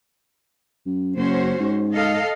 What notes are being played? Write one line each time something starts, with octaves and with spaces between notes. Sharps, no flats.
F#2
F#1 C#4 F#4 C5
G#2
A4 D#5 F5